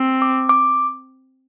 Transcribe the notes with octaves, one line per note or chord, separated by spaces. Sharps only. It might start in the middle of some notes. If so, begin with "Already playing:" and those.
Already playing: C4
D6
D6